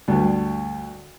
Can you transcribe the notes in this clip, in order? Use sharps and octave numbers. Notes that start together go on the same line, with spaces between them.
D2 G2